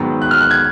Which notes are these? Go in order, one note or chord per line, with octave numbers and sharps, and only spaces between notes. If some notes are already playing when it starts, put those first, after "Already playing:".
Already playing: G#2 D#3 F#3 B3
F#6
F6
F#6
G#6